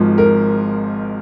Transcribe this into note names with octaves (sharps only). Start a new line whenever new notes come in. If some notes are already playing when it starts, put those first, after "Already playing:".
Already playing: G#1 G#2 F3
A#4